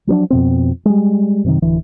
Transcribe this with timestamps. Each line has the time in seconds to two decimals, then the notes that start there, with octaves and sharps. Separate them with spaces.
0.07 F3 F#3 A#3 D4
0.30 F2 B2 C4
0.85 G3 G#3
1.44 F#2 C3 D#3
1.62 D1 D3 E3